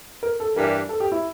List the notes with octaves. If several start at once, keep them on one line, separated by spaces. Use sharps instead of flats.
A#4
A4
G2 E3 G3 D4 A#4
A4
G4
E4